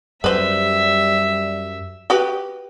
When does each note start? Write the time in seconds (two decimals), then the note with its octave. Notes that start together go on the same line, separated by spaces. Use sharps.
0.24 F#2 G3 B4 C5 E5
2.10 F#4 G4 B4